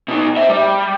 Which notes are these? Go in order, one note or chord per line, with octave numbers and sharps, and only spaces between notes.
B2 D#4
C5 E5
G3